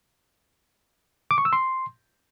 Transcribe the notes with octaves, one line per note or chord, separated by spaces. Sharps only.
D6
C#6
E6
C6